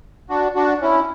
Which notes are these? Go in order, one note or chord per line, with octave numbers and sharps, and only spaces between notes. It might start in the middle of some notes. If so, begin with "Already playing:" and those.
D4 F#4
D4 F#4
C#4 E4